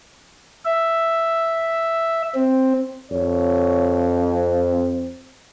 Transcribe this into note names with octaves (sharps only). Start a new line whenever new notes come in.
E5
C4
F2 C#5
C4